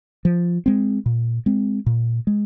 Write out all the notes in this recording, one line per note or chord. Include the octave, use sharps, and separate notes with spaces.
F3
G#3 C4
A#2
G#3 C4
A#2
G#3